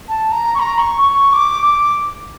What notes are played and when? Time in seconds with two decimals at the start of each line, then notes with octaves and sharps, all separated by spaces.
0.08 A5
0.32 A#5
0.55 C#6
0.60 A#5
0.78 C#6
1.02 C#6
1.32 D6
1.63 D6